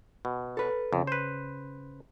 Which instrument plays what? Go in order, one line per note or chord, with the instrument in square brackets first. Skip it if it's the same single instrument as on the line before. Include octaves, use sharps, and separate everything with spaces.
[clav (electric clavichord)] B2
[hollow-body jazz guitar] A4 B4
[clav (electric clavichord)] F2 [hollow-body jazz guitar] C#3
[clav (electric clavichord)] B4 C5